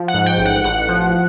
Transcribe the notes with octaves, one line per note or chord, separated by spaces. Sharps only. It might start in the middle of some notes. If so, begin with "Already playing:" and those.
Already playing: F3
F#5
G#2
G5
A1
F#5
A1 F#5
F3